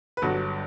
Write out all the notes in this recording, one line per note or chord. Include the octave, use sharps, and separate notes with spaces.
B4
G1 G2 F#3 F#4 A4